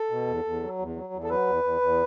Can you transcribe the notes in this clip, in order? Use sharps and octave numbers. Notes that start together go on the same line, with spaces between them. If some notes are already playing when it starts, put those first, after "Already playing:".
Already playing: A4
B2
E2
E2
F#3
E2
F#3
E2
A4
F#3 B4
E2
E2
E2